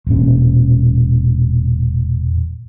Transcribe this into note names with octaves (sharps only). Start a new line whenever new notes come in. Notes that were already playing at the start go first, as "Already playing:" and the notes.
E1 A#2 C#4